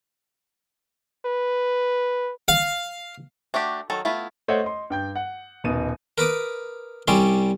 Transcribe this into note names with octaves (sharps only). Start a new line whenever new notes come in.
B4
F5
A3 D4 F#4 G4
D#3 F#3 A4
A3 B3 E4 F4
A3 C5 C#5 D#5 E5 F#5
D#5 C6
G2 G5 G6
F#5
D#1 B2 D#4 D#7
A#4 B4 D6 D#6
C2 G3 C#4 D5 C6